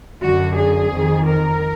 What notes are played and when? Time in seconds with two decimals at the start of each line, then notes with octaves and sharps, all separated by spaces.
0.21 F#2 D3 F#4
0.56 G#4
0.91 F2 D#3
1.26 A#4